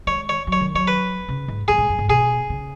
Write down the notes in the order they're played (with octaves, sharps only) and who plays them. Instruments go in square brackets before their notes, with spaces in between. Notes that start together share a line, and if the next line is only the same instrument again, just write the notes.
[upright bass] G#3 [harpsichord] C#5
[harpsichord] C#5
[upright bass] F#3
[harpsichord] C#5
[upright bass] D#3
[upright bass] F#3 [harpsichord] C#5
[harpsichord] B4
[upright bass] C#3
G#2
[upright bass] G#2 [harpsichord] G#4
[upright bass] G#2
F#2
G#2
[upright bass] B2 [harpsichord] G#4
[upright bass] C#3